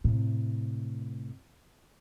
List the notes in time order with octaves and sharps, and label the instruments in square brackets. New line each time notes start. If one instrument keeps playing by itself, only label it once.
[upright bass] A2 C3